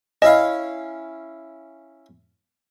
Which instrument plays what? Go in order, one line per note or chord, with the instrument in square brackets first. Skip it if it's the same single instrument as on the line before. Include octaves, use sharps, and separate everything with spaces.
[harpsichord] C#4 E4 F5 [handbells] D#5